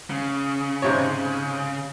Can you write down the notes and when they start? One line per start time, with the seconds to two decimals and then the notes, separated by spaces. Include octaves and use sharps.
0.10 C#3
0.82 G#2 C3 C#5